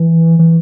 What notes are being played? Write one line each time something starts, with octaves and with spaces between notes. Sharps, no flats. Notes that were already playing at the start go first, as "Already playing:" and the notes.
Already playing: E3
E3